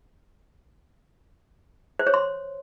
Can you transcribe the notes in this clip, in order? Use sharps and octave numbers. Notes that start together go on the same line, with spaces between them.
C5
C#5
C6